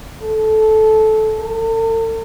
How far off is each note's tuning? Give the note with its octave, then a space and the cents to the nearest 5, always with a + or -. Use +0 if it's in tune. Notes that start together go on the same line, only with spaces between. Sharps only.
A4 -15
A4 +45